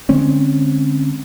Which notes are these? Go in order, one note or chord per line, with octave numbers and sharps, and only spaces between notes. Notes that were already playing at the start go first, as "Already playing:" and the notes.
D3 G#3 C4 C#4